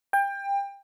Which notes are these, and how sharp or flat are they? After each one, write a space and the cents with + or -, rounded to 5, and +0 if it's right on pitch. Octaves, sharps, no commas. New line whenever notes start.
G5 +25